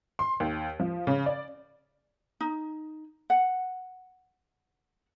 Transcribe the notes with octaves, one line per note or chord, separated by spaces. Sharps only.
C6
D#2
F3
C#3
D5
D#4
F#5